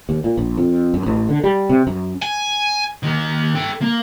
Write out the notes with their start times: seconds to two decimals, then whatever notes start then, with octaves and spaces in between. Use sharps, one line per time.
0.09 D#2
0.24 A#2
0.37 A#1
0.58 F2
0.94 F#2
1.06 A1
1.29 D3
1.44 G3
1.69 C3
1.87 F#2
2.22 G#5
3.03 D#3 A#3
3.55 A4 G5
3.81 A#3